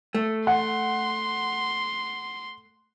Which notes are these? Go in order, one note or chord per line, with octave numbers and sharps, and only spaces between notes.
A3
F#5 C6